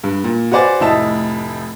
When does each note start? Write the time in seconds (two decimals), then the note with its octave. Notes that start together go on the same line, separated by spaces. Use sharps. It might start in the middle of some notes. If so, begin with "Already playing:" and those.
0.04 G2
0.24 A#2
0.52 F#4 B4 C5 D5 G#5
0.80 F1 A2 D#5 E5 A5